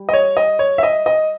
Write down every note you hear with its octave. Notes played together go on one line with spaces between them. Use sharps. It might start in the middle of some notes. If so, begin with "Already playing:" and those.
Already playing: G3
D#5
C#5
D#5
C#5
E5
D#5
D#5